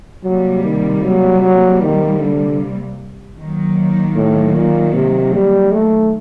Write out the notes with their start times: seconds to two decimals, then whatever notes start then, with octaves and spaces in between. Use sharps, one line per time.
0.24 C3 F#3 G3 A#3
0.64 D#3
1.03 F#3
1.42 F#3
1.82 D#3
2.20 D3
3.38 D#3 F#3 A#3
4.16 A2
4.55 A#2
4.95 C3
5.34 G3
5.72 A3